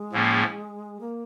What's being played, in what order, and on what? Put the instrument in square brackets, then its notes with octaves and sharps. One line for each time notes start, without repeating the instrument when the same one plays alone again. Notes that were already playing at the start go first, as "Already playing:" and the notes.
Already playing: [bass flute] G#3
[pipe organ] A2 F3 A#3 C#4
[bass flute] A#3